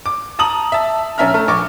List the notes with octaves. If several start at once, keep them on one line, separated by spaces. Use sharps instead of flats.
D6
A5 A#5 D#6 F#7
E5 A5
A#1 C#4 E5 A#5 F6
A3
A#1 C#6 D6